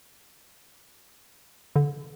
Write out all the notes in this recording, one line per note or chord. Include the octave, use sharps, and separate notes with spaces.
D3